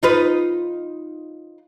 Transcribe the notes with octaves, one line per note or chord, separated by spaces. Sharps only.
D#4 F4 B4